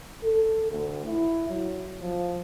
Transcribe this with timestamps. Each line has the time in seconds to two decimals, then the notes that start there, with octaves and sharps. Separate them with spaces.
0.24 A4
0.71 D2
1.06 E4
1.49 F#3
2.02 F3